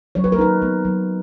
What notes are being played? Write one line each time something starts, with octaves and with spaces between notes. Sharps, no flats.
F#3 C#5
B4
A#4
D#4 B4
B3
F#3